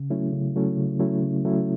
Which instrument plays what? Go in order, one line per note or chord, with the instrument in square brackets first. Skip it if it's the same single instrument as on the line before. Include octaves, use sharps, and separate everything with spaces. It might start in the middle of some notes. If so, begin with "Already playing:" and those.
Already playing: [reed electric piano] C#3
F#3 A3 C#4 E4
C#3
F#3 A3 C#4 E4
C#3
F#3 A3 C#4 E4
C#3
F#3 A3 C#4 E4